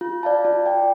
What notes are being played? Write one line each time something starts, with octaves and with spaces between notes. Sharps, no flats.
F4
D5 F5 A5
F4
D5 G5